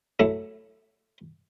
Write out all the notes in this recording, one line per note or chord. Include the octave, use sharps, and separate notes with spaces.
F#3 A3 E4